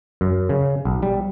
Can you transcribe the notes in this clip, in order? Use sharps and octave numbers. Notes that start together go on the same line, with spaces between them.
F#2
C#3
B1
G3